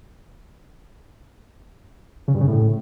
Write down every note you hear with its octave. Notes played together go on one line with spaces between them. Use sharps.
C#3
G2
C#3
A2